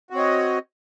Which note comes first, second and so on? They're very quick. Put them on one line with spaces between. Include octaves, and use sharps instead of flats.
F#4 C4 C#5 D#5